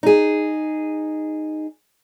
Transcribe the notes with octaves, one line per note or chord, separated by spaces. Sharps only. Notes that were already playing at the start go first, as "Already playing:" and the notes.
D#4 G#4